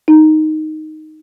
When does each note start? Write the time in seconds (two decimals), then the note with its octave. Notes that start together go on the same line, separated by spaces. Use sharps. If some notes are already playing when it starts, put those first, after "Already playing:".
0.08 D#4